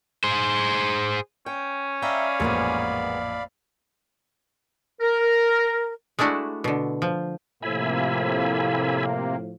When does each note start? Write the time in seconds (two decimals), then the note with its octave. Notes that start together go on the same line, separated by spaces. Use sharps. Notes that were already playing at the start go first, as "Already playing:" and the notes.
0.24 G#4 C5
1.46 C#4 G5
2.02 D5 E5 F5 G5 A#5 B5
2.40 A1 F2 A#2 G#3 A#3 B3
5.00 A#4
6.19 G#3 A3 D4 E4 F#4
6.64 B2 D3
7.02 F3
7.63 A2 C3 F3 A#3 E5 G#5 B5